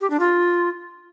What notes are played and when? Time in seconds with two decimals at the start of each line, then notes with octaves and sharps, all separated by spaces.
0.01 G4
0.10 D4
0.20 F4